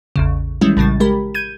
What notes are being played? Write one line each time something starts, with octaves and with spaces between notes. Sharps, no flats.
A1 E2 C#3
D#3 E3 G3 G#3 C#4 E4
A#1 A2 C#3 G3 A6
G#3 G4 A#4 B5
G6 G#6 D#7